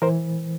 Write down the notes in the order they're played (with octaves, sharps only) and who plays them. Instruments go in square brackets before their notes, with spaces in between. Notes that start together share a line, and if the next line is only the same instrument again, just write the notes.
[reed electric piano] E3 A#4 C5